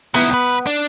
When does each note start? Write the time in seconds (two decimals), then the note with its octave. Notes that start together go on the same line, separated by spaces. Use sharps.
0.14 D#3 B3 E4
0.30 C2 B4
0.67 D4